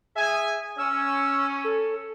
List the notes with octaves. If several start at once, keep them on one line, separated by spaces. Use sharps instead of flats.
G#4 E5 G#5
C#4 E6
A4